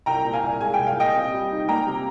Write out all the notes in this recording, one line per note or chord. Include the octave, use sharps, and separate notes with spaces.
C2 G5 A#5
A#2
F5 G#5
C2
G#3 G#5
C2 G5
F5
A#2 D#5 G5
C3
G3
D#4
A#3 G5 A#5
C3